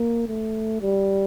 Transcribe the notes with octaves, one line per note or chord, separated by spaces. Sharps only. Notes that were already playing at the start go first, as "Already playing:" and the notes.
Already playing: A#3
A3
G3